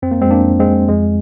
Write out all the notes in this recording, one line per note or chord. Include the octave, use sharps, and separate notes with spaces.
F2 C4
A#3
F2 G#3 C4
A#3 D4
F2
G#3 C4
F2
F2 G#3